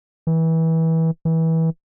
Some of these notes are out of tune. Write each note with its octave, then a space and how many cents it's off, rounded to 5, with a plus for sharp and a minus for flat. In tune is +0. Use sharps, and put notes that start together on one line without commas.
E3 -25
E3 -25